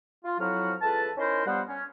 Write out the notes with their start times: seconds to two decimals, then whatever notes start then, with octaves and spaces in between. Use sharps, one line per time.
0.24 F4
0.39 F2 F3 F#3 E4 F#4 F6
0.82 C#2 E3 A4 B4 A5
1.18 C#4 D#4 E4 A#4 C5
1.46 G2 F3 G3 B3 C5 F#5
1.69 C#4